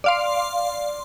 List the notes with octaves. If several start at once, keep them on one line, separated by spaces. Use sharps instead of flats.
D5 F5 C6